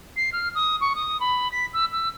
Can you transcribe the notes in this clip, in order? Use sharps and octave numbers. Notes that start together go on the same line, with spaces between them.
C7
F6
D#6
C#6
D#6
B5
B6
E6
E6